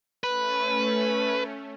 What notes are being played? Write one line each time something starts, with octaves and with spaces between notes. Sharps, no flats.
A3 C#4 B4